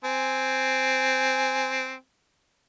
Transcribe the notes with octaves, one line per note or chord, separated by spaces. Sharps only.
C4 G#5